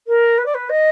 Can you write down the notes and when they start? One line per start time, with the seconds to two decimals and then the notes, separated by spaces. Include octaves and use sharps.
0.07 A#4
0.38 B4
0.45 D5
0.54 B4
0.69 D#5